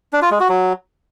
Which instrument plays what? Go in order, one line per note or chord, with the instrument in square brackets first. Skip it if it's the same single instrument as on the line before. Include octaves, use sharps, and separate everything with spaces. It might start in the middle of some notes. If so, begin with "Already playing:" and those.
[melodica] D4
F4
G#3
F#4
F#3